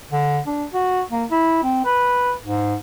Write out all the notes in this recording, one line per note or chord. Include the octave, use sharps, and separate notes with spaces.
D3
D4
F#4
A#3
E4
C4
B4
G#2